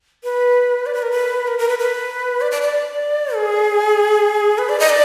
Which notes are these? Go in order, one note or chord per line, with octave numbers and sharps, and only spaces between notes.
B4
D5
B4
A#4
B4
A#4
A#4
B4
B4
D5
D5
D5
G#4
B4
D5
D#5
D5